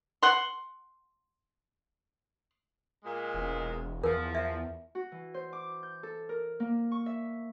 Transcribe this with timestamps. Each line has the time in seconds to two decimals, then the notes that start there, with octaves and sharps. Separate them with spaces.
0.23 F#5 C6
3.04 A#2 G#3
3.34 E1
4.04 E2 F3 A#4
4.35 E5
4.95 F#4
5.12 E3
5.34 C5
5.53 D6
5.83 G6
6.03 A4
6.29 A#4
6.60 A#3
6.92 C#6
7.06 E5